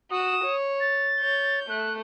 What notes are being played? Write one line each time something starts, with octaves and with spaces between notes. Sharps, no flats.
F#4 D#6 E7
C#5
A6
C#5 G6
A3 F#6